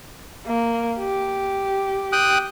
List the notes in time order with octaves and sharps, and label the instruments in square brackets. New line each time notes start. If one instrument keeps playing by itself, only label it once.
[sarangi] A#3
G4
[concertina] G5 D#6 F#6